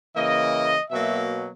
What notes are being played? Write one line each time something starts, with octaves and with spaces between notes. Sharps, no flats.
C#3 E3 A#3 D#5
B2 F#3 A#3 E5